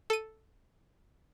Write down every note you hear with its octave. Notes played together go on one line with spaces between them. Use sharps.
A4 D#7